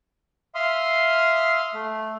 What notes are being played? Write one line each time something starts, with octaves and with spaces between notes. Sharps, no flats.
E5 F5 C6 D#6 F6
A3